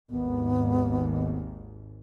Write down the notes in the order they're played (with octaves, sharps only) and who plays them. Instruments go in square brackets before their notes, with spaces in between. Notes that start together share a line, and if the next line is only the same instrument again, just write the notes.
[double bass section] G#1 D#2 G#2 [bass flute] B3